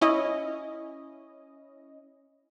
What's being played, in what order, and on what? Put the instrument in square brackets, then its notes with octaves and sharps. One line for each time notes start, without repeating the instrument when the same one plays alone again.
[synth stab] C#4 E4 D#5